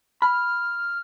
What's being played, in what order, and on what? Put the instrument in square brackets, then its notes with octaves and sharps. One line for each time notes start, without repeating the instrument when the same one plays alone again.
[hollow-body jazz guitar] B5 [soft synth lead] F6